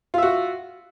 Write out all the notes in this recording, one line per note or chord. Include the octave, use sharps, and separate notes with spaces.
F4 F#4 E5